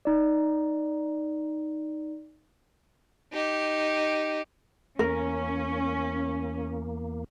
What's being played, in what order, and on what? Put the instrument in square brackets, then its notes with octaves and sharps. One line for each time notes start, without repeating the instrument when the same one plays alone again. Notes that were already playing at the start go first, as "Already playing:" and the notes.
[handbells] D#4 D5
[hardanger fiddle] D#4 G4
[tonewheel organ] E2 A#3 [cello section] C#4 [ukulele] A#4